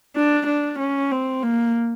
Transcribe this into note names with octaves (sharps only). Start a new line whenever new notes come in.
D4
D4
C#4
C4
A#3